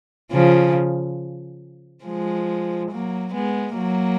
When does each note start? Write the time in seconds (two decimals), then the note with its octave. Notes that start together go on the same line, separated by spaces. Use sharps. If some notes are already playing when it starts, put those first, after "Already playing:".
0.32 C#3 F3
2.05 F3 G#3
2.91 F#3 A#3
3.34 G#3 B3
3.77 F#3 A#3